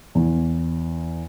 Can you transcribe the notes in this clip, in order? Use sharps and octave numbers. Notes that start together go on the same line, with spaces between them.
E2